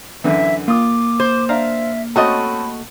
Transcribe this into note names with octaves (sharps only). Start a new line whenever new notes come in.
F#2 D3 E3 E5
A#3 F4 D6 D#6
C5
D4 E5 F5 A#5
A3 C4 C#4 F#4 A4 D#5 B5